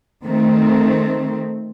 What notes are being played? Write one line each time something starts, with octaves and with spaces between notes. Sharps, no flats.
D#3 A3 C4